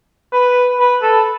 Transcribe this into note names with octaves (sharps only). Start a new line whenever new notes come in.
B4
B4
A4